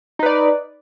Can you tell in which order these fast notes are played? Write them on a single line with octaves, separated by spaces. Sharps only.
D#4 B4 D5